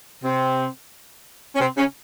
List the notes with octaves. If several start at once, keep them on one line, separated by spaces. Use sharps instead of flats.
C3 C4
C#4
C3 C4
C#3 C#4